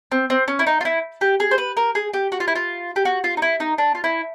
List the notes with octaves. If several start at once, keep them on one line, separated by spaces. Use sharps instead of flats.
C4
C4
C#4
E4
D#4
F4
E4
G4
G#4
C5
B4
A#4
G#4
G4
F#4
F4
E4
F4
G4
F#4
F4
D#4
E4
D#4
D4
F4
E4